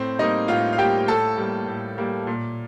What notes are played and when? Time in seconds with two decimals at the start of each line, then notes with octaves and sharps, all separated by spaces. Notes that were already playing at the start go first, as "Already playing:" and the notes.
Already playing: A2 C4 C5
0.19 G3 A#3 D#4 D#5
0.48 A2 F4 F5
0.73 F5
0.78 G3 A#3 G4 G5
1.08 A2 A4 A5
1.38 G3 A#3
1.67 A2
1.98 G3 A#3
2.27 A#2